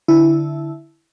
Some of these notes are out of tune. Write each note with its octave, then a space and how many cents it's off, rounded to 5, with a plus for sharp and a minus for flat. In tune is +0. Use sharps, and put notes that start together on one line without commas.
D3 +0 E4 +0 A5 -15